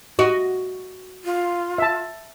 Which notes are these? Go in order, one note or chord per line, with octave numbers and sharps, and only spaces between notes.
F#4 D#5
F4
E5 A5